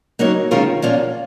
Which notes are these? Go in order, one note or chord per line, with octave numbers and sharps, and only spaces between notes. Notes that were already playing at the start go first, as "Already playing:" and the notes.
F#3 A#3 D#4 A#4 C#5
D#3 G#3 C#4 F4 A#4
A#2 F3 A#3 C#4 F4